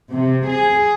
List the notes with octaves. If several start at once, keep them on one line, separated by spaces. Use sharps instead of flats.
C3
G#4